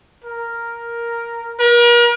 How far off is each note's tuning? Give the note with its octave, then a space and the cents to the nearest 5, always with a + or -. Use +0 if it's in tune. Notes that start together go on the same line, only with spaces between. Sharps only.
A#4 +0
A#4 +40